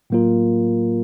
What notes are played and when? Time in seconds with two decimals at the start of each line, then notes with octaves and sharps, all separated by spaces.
0.10 A2 F#3 A#3 F4 A#4